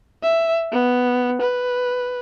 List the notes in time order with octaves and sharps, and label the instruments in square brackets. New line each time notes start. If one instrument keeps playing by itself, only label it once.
[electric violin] E5
B3
B4